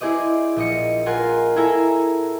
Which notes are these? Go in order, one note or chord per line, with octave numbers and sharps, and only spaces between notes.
E4 G#4 C5 D5 D#5
A#1 D#5 C#7
F4 A#4 F#5 G#5 C6
E4 G#4 A4 G#5 A#5 E6